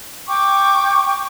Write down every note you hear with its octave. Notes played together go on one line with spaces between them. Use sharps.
G5 C#6 D6